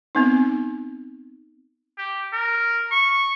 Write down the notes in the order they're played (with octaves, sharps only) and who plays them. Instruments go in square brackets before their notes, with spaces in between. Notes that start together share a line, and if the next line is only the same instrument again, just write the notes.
[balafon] B3 C4 D#4
[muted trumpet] G4
A#4
C#6